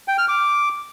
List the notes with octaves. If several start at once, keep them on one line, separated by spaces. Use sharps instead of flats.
G5
F6
D6